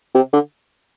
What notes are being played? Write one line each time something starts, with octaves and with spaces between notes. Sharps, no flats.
C3
D3